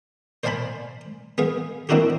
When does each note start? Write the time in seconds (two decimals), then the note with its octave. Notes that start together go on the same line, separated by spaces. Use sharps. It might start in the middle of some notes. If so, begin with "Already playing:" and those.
0.44 C5 D5 F5 G#5 A5 B5
1.38 B3 G#4 F5
1.89 A#3 C4 D4 E4 F#4 G4